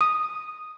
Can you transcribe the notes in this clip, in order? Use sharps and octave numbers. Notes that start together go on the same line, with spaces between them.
D#6